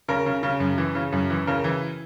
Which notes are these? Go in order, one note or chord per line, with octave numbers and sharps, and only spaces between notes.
C#3 A#4
C#3
C#3
F#2
E3
C#3
F#2
E3
C#3 A#4
E3